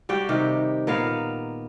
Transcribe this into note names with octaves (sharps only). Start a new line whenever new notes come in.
G3 F#4 G4 G5
C3 D#3 G4 A#4
A#2 B3 A#4 F5